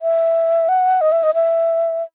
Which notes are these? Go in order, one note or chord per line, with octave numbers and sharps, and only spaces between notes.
E5
F#5
D#5
E5
D#5
E5